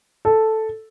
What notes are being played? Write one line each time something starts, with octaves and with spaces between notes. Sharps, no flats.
A4